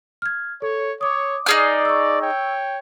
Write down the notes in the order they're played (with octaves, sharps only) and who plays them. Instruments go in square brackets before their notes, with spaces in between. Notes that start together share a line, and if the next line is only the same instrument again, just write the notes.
[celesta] F6 G#6
[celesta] A4 [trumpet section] C#5
[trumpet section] C#5 [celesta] D6 D#6
[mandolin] D#4 G#4 F6 [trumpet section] D5
[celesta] C#6 E6
[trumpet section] C#5 G5